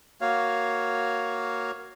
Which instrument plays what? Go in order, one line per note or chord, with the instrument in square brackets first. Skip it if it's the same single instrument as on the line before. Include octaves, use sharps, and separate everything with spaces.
[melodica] A#3 F#4 C#5 F5